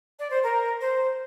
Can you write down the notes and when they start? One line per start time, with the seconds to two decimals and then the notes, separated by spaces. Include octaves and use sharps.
0.19 D5
0.31 C5
0.43 A#4
0.81 C5